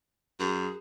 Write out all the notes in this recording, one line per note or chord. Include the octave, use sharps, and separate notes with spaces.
F#2 G#4